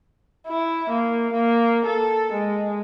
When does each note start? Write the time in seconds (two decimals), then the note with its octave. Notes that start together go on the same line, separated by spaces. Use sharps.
0.47 E4
0.90 A#3
1.33 A#3
1.86 A4
2.32 G#3